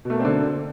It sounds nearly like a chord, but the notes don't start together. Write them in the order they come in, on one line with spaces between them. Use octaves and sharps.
B2 A3 A#3 C4 D3